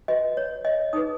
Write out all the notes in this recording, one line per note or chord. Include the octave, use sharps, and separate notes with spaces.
F#4 B4 D#5
C#5
D#5
D#4 G#4 B4 D#6